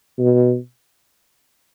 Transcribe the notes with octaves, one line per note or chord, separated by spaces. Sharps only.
B2